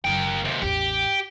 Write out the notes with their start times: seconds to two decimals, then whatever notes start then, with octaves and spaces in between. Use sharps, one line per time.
0.05 F#1 F#3 A#3 G5
0.45 D#2 C3
0.62 A1 E2 G4